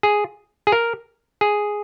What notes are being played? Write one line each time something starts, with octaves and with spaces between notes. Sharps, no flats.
G#4
G#4
A#4
G#4